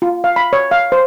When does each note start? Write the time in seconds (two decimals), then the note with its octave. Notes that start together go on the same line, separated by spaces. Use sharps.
0.02 F4
0.24 F5
0.36 B5
0.53 C#5
0.71 F5
0.92 C5